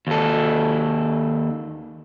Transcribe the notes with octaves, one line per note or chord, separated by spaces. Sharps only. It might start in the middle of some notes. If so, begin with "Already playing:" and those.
D#2 A4